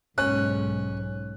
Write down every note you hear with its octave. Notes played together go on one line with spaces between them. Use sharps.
B1 G#2 C#4 F#6